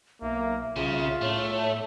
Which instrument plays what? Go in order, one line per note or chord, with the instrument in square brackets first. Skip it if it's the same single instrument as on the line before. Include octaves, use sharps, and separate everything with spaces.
[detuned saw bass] B1 [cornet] A#3 [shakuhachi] E5
[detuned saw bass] C2 [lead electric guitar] C#3 [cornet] F4
[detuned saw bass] A2 [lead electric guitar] A3 [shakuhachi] C#5